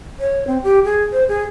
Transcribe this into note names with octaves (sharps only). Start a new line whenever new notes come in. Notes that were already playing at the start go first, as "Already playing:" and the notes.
C#5
C4
G4
G#4
C5
G#4